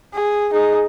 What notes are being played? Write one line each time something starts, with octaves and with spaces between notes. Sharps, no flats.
G#4
D#4 G#4